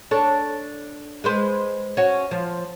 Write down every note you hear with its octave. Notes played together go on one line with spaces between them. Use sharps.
D4 A4 C#5
G#3 B4 C5
C#4 F#4
F3